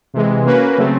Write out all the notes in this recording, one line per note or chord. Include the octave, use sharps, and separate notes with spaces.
C3 E3 G#3
A#3 C#4 F#4 B4
C#3 F#3 A3 C4